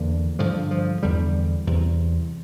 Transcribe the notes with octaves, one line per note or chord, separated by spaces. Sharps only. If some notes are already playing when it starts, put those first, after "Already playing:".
Already playing: E2 D3 A#3
G2 D3 F3
F3
E2 D3 G3
E2 C3